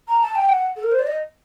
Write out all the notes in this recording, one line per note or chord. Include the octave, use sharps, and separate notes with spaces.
A#5
A5
G5
F#5
A4
A#4
C5
D5
D#5